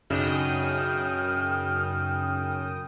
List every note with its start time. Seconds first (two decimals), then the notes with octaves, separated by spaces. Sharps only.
0.10 B1 F#2 C#3 D4 G5 D#6 F6